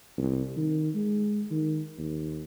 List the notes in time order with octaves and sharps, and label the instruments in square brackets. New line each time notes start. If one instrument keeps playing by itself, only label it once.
[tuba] C2
D#3
G#3
D#3
D#2